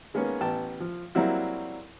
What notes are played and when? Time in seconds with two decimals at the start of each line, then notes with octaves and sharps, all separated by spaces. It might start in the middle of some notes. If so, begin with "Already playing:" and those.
0.14 D#3 G#3 A#3 B3 C#4
0.41 A1 B3 G5 A5
0.80 F3
1.15 F#3 G3 A#3 C4 E4 F#4